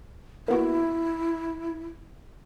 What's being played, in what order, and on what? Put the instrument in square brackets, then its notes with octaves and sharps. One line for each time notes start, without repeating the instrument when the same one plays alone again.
[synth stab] A#3 B3 F#4 [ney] E4